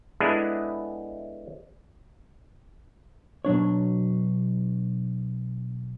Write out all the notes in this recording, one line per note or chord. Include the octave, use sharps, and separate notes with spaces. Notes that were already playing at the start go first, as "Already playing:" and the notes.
G#3 A3 B3 D4 E4 G#4
B2 F#3 D4 C#5